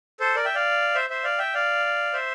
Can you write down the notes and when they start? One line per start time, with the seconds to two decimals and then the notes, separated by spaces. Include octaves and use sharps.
0.20 A4 C5
0.36 A#4 D5
0.45 E5 G5
0.55 D5 F5
0.95 C5 E5
1.10 C5 E5
1.24 D5 F5
1.39 E5 G5
1.54 D5 F5
2.13 C5 E5